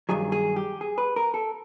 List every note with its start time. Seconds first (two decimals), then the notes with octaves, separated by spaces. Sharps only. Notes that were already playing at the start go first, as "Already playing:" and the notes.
0.09 G2 D#3 F#3 G#4
0.32 G#4
0.56 G4
0.81 G#4
0.98 B4
1.16 A#4
1.34 A4